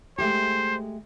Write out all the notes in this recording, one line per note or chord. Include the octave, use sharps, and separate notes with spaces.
G#3 A3 G4 C5